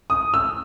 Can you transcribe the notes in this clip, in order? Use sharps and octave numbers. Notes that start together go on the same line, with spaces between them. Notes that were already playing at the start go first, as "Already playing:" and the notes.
D#6
E6